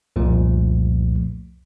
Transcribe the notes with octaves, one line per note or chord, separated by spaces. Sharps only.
C2 F2 A#2 F3 A3